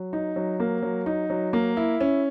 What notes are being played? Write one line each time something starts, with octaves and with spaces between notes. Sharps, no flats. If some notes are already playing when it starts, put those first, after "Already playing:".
Already playing: F#3
D#4
F#3
A#3
F#3
D#4
F#3
A#3
E4
C#4